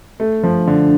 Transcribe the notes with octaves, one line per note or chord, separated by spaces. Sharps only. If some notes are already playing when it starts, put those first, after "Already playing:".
A3
F3
D3